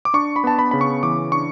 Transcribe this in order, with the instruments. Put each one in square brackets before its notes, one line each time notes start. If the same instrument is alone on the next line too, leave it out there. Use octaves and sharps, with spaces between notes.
[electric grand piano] D6
D4 C#6
B5
B3 A5
B5
C#3 B5
C#6
E3 D6
D4 C#6